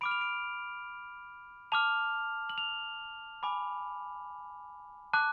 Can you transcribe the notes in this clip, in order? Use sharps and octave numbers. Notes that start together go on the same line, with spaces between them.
B5 D6 F6 D7
F7
D7
A5 D6 F6 F7
F#7
F7
G#5 B5 D6
A5 D6 F#6